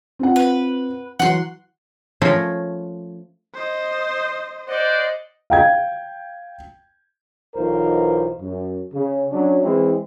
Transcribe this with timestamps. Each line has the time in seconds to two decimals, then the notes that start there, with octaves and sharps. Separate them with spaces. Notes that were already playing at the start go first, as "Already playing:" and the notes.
0.19 C4 F4 F#5
0.36 B4
1.19 E3 F#3 F#5 C6
2.22 F3 A3 C#4 F4 A#4 C#5
3.54 C5 D#5
4.68 C5 D5 D#5 F#5
5.50 F5 G5 G#6
7.55 B1 E3 D#4 F4 A#4 C5
8.40 F#2
8.93 C#3
9.32 F#3 C#4 D4
9.63 E3 G#3 C4 E4